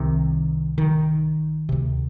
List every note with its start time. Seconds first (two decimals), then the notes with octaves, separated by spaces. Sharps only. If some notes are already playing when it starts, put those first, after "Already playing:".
Already playing: C2 C3 D#3
0.78 D#3
1.69 D2 C3